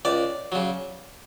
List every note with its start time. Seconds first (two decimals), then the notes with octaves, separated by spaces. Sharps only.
0.05 C#2 D5
0.52 C#3 F#3